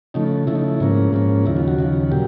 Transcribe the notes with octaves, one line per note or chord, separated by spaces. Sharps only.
C#3 F3 A3 D#4
C#3 F3 A3 E4
D#4
E4
G#2 F3 A#3 C#4
G#2 F3 A#3 C#4
D#2 C#3 F3 E4
F4
F#4
D#2 C#3 F3
A#2 F#3 G4